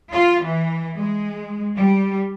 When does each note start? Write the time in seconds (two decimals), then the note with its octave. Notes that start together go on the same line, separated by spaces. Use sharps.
0.11 F4
0.42 E3
0.97 G#3
1.78 G3